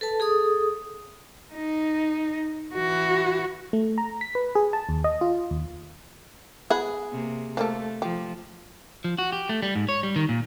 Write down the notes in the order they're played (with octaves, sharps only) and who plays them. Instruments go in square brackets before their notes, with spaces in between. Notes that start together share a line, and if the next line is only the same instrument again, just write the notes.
[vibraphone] A4 B4 A5
G#4 A4 D#6
[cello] D#4
E3 F#4
[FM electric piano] A3
A#5
B6
B4
G#4
A5
D#2
D#5
F4
D#2
[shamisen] B3 F#5 B5 [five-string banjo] G#4
[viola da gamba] C3 A#3
[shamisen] F3 A#3 A4 [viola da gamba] A3
[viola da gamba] F3 [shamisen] G4
[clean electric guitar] F3
F#4
G4
A3
G3
G#2
C#5
G3
D#3
A#2